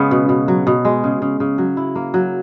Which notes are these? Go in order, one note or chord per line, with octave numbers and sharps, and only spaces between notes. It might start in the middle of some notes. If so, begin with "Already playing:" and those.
Already playing: C#3 G#3 B3
B2
B2
F#3
B2
G#3
C#3
C#3
C#3
F#3
E4
A#3
F#3